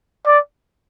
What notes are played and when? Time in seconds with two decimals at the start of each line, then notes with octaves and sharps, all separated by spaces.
0.26 D5